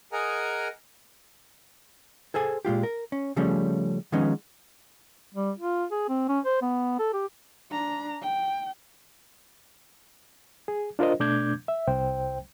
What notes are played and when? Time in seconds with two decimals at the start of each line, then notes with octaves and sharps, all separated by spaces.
0.12 G#4 A#4 D#5 F#5 G#5 A#5
2.34 G#4 A4 C5 G#5
2.65 A#2 G#3 F4 G4
2.83 A#4
3.12 C#4
3.36 C#3 F3 G3 A3 C#4
4.12 D#3 F3 G#3 B3 C#4 D#4
5.35 G3
5.58 F4
5.91 G#4
6.09 C4
6.28 C#4
6.45 C5
6.62 B3
6.99 A4
7.13 G4
7.70 D4 A#5
8.22 G5
10.68 G#4
10.99 D4 F4 A#4 C5 D#5
11.20 B2 A3 D4 D6 G6 G#6
11.68 E5
11.87 C2 C5 G5